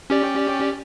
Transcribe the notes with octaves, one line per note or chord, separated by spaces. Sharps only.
C#4 G4 D5